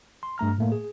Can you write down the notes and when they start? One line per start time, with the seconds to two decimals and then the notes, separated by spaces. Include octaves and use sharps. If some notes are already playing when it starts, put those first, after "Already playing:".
0.23 C6
0.38 G2 A3 A#5 F6
0.58 A2 A3 A#3
0.72 G#4